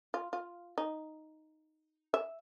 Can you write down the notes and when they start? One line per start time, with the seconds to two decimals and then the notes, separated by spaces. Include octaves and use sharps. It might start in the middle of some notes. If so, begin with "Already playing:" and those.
0.14 F4
0.33 F4
0.78 D#4
2.14 E5